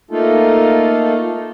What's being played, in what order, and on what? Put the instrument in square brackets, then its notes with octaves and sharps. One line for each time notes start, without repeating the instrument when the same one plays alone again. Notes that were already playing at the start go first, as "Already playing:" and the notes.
[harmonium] A3 A#3 D#4 F4 A4